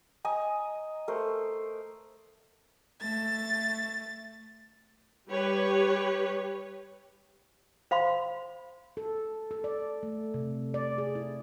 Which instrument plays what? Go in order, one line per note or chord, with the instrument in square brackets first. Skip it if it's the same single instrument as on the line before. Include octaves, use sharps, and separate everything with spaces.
[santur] D#5 G#5 A#5
A3 A#4 C5
[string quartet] A3 A6
[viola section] G3 G4 B4 C#5
[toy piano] C5 F5 B5 C6
[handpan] A4
A4
D5
A3
C3
D5
G#4
E4